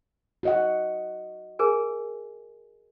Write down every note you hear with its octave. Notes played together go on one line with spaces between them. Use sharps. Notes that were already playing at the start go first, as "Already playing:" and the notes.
F#4 D#5 F#5
G#4 A#4 G#5